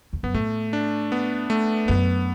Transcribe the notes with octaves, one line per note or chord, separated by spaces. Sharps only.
E2
F#2 B3
A2 A3
D4
B3
A3
F#2 B3